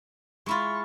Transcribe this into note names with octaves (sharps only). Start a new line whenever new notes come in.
G#3 E4 F4 C#6